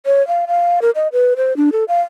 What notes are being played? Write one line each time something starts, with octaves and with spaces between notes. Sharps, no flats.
C#5
F5
F5
A#4
D#5
B4
C5
D4
A4
F5